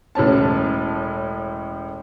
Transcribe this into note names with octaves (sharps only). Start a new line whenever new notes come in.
E1 A2 C#4 A5